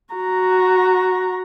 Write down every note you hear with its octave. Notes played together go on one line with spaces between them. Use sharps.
F#4 A#5